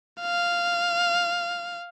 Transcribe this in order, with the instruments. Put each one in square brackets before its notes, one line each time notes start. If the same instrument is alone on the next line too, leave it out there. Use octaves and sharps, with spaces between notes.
[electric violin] F5